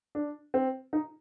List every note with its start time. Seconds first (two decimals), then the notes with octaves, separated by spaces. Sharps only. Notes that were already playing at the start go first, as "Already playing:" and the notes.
0.15 D4
0.54 C4
0.93 D#4